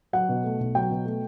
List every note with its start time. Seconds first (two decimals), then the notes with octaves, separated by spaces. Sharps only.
0.13 F#3 F#5
0.29 B2
0.44 A3
0.60 B1
0.75 F#3 G5
0.91 B2
1.05 A3